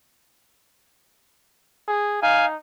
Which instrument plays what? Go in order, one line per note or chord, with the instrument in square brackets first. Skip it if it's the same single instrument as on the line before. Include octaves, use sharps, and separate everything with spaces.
[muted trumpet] G#4
[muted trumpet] D#4 [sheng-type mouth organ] F5 G#5